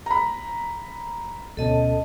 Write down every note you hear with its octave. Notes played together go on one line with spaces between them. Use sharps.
A#5 B5
D2 B2 C#4 A4 D#5 A5